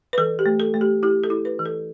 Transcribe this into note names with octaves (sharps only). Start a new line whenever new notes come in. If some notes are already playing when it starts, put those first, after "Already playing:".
B4
E3 A4
G4
A3
A4
A3
G4
E4 G4
A4
E4
B4
E3
A4